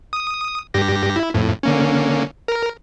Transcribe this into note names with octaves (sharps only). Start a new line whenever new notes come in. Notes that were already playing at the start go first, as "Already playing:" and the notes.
D#6
G2 G4 A#6
E4
F2 A2
D3 A#3 C#4
A#4